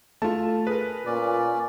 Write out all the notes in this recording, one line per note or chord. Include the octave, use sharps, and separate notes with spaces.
A3 F4 A5
G#4 A#4 B4
A#2 C#4 D5